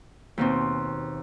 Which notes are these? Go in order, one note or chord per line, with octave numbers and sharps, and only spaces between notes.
D#2 B2 C4